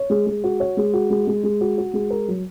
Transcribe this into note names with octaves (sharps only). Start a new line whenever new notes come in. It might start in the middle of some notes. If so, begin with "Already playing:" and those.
Already playing: C#5
G#3
G#3
F#4
C#5
G#3
F#4
G#3
G#3
G#3
F#4
F#4
G#3
A#4
F#3